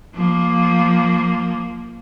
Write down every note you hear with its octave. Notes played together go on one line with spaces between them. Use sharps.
F3 A#3